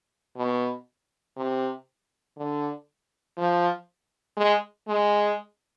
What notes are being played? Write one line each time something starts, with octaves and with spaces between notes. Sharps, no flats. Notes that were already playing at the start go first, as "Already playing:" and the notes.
B2
C3
D3
F3
G#3
G#3